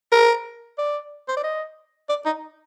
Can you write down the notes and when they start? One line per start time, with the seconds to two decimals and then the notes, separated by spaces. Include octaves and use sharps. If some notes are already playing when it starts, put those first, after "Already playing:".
0.12 A#4
0.78 D5
1.28 C5
1.37 D5
1.44 D#5
2.09 D5
2.26 D#4